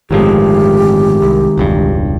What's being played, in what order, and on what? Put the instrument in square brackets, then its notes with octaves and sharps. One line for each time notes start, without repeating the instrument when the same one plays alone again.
[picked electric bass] G1 A2 F3 [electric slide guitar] D#3 G#3 [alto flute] G4
[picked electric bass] C2
E1 C#2 G2